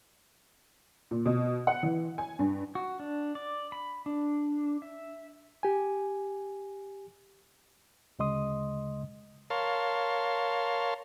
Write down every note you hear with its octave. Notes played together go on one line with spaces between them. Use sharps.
A#2
B2
F#5
E3
G#5
G2
F#4
D4
D5
B5
D4
E5
G4 G#5
D2 C#3 G#3 D#5 C6 D#6
A#4 C#5 F5 A5 C6